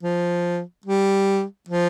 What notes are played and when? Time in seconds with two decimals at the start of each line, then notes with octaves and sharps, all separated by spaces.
0.03 F3
0.86 G3
1.68 F3